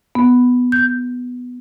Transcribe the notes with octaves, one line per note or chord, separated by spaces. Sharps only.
B3
G6